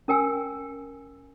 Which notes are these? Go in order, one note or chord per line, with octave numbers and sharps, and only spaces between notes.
C#4 A#4 G5 G#5 E6